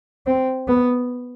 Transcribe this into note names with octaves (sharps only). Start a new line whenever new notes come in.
C4
B3